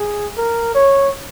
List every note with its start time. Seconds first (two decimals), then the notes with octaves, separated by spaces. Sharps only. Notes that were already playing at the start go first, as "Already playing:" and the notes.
Already playing: G#4
0.37 A#4
0.75 C#5